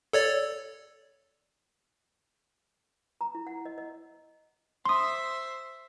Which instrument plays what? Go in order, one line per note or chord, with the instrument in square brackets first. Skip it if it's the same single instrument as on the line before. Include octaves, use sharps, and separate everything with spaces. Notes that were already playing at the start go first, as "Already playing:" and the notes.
[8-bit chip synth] A4 C#5 D5
[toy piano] A#5
E4
F#5
D#5
D#5
[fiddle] C5 E5 [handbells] C6 D#6